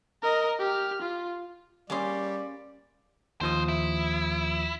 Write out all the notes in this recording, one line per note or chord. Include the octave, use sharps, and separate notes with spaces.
A#4 D#5
G4 F6
F4
G3 A#3 C#4 G#4 D5 C6 D6
D#2 F3 A3 C5 D#6
E4